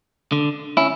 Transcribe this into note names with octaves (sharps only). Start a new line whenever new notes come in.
D3
C#4 E4